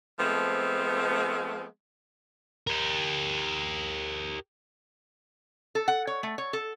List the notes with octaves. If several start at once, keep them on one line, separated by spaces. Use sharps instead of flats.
F3 G#3 A3 B3 C4
G4 A#4
A4
F#5
C#5
A3
C#5
A4